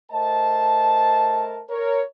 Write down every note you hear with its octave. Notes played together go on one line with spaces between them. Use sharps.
A3 A#4 C5 D#5 A5
A#4 C#5